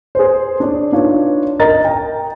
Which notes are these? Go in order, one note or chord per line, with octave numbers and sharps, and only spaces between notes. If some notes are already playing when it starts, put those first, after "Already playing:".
G#4 B4 C5
D4 C#5 D5
D4 D#4 F4 B4 C#5
A#4 D#5 A#5 A6
G5 A#5